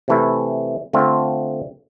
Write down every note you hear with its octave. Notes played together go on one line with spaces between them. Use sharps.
C3 E3 A3 E4
D3 A3 C4 F4